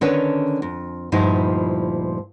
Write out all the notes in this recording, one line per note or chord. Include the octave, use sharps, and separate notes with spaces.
D3 D#3 C#4 D4 B4 C#5
F2
D2 G2 A#2 F3 D#4 E4